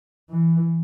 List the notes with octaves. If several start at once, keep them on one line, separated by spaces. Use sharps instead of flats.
E3